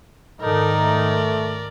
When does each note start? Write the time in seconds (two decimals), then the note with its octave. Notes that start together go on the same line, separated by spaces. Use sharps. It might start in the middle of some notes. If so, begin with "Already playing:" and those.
0.42 G#2 D#3 D#4 A4 A#4 D5
0.78 A3